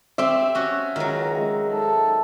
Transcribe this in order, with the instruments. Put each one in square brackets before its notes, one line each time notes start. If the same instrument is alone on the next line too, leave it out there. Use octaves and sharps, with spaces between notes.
[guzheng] C4 G4 [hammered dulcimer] E5
[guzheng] C#4 F#4
[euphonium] C#2 [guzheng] D#3 F#3
[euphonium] G#3
[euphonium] G#2 [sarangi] A4